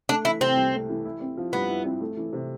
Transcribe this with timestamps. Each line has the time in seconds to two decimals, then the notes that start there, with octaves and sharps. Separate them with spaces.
0.09 A3 D4
0.25 E3 E4
0.41 C3 C4
0.57 C2
0.73 A3
0.89 E3
1.05 E4
1.21 C4
1.37 F3
1.53 G2 B3
1.69 E4
1.84 C4
2.01 A3
2.17 E3
2.33 C3